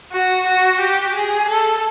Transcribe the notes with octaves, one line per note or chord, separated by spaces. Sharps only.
F#4
F#4
G4
G#4
A4